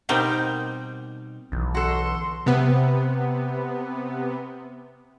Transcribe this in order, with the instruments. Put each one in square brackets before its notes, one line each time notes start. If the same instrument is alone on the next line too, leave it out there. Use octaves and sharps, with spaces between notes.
[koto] B2 G3 C4 D#4 A#4 G5
[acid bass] B1 [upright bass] D3 E3
[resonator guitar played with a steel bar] F#4 A4 [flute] C6
[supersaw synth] C3 B3